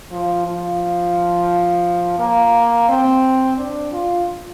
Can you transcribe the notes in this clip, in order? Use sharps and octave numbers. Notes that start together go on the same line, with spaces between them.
F3
F3
A#3
C4
D4
F4